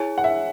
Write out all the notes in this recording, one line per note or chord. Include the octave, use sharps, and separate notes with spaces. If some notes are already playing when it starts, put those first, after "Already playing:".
Already playing: E4 G#4 C#5 G#5
F#5
E5